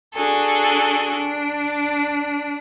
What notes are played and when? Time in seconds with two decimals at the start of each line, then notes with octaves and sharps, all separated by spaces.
0.14 D4 F#4 G#4 A4
1.14 D4